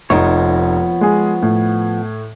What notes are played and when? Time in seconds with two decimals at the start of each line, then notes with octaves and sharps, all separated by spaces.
0.10 F1 F3 B3 D#4 C#5
1.01 G#3 G#4
1.43 A2